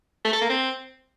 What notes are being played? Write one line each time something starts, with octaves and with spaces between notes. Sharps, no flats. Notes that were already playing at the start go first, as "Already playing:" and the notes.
A3
A4
A#3
C4